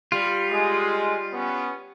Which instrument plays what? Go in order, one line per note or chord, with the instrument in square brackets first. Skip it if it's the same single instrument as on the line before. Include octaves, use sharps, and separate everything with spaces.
[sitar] G3 [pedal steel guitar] F4
[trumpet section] G#3
B3 C#4